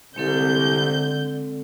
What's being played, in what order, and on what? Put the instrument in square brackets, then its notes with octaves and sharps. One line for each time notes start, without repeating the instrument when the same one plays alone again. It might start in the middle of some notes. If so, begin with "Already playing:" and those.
[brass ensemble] C2 [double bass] D3 [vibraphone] G#3 C4 A4 [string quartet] G6